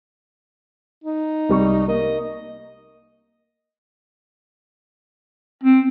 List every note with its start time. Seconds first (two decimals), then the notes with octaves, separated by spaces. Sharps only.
1.04 D#4
1.49 C2 G3 C#6
1.88 A#3 D#5
5.64 C4